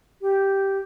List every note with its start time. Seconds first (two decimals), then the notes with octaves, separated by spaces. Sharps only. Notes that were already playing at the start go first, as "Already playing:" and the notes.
0.21 G4